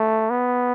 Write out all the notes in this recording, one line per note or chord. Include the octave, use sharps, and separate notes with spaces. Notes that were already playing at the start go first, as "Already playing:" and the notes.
Already playing: A3
B3